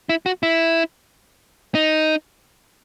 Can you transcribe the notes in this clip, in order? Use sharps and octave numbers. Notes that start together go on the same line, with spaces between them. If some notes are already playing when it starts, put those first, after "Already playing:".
E4
F#4
E4
D#4